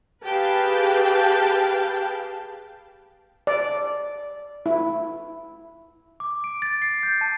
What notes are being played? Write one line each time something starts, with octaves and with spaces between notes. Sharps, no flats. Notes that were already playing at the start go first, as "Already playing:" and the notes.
G4 G#4 B4 F5 G5 A5
D5
E4
D6
D7
A6
C7
G6
A5